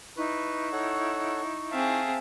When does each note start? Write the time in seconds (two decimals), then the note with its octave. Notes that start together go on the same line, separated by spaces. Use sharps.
0.17 D#4 E4 B4 C#6
0.73 A4 C#5 F#5
1.71 C4 G#4 E5 F5 A5